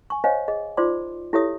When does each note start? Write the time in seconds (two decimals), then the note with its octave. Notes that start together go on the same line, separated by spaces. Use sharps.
0.10 G#5 C#6
0.24 C5 C#5 D#5 F5 G#5
0.48 G#4 D#5
0.77 D#4 F4 C5 D5 C6 D6
1.33 E4 G4 A4 C#5 E5 D#6